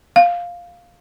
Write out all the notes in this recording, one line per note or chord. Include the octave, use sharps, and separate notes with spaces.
F5